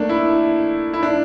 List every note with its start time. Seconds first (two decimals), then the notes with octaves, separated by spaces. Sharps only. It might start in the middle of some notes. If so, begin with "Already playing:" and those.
Already playing: A3 A#3 D4
0.09 E4
0.93 E4
1.03 D4